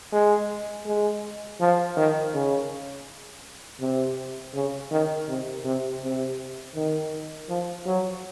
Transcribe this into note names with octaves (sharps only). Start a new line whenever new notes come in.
G#3
G#3
F3
D#3
C#3
C3
C#3
D#3
C3
C3
C3
D#3
F3
F#3